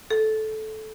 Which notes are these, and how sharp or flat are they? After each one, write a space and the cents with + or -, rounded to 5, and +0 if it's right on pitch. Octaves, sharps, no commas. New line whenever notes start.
A4 -15